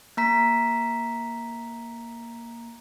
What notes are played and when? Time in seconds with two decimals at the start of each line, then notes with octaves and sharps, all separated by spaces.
0.17 A#3 A#5 B6